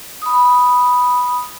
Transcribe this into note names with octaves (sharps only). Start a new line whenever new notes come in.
B5 D#6